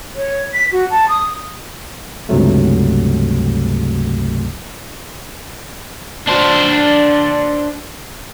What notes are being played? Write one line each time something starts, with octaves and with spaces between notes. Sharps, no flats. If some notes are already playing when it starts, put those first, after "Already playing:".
C#5
B6
F#4
A5
D#6
C#2 G2 C3 F#3 A3
D4 C5